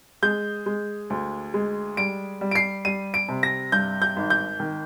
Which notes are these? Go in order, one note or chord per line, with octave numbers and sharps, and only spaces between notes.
G#3 G6
G#3
D2
G#3
G3 D7
G3
D7
C7
G3 D#7
D7
C3
A#6
G2 G6
G6
G#1
G6
D#3